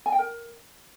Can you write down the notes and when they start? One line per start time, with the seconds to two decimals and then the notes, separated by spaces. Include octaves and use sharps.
0.06 G#5
0.12 G5
0.19 A#4